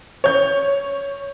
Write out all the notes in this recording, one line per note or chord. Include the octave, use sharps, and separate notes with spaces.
C#5 G6